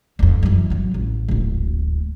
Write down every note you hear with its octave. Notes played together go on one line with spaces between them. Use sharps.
F1 F2
F#2 E3
G#1 F#3
A1
D1 G#1